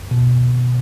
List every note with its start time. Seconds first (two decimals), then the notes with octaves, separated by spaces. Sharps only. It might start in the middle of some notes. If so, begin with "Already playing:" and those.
0.11 B2